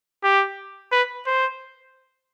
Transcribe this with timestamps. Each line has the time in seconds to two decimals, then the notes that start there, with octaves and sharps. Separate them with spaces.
0.24 G4
0.92 B4
1.26 C5